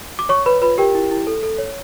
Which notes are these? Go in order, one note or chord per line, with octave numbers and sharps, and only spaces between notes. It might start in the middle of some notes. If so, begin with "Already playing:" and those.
D6
C#5 C#6
B4 C#5 B5
F4 B4 B5
G4 A#4 G5
E4
E4
A4
A4
C#5